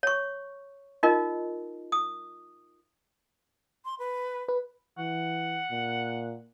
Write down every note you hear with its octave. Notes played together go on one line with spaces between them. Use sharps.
C#5 C#6
D#4 F4 A#4 D#5
D#6
C6
B4
B4
E3 F#5
A#2